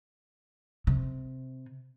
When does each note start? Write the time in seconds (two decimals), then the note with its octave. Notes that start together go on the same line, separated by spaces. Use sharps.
0.87 C3